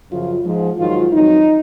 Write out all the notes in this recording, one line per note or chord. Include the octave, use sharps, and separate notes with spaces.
F#2 C#3 F3 F4
G#2 F3
G#2 D#3 F#3 F4
F2 D#3 F#3 D#4